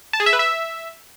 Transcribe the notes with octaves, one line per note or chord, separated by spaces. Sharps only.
A5
G#4
E5
B4
E5